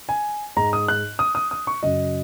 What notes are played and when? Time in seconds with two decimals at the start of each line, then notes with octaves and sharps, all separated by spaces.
0.09 G#5
0.56 G#2 G#3 A#5
0.73 D#6
0.88 F#6
1.19 D#6
1.35 D#6
1.51 D#6
1.67 C#6
1.83 F#2 C#3 F#3 D#5